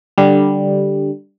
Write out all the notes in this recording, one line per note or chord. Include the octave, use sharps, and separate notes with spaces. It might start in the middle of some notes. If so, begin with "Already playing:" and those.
D3 G3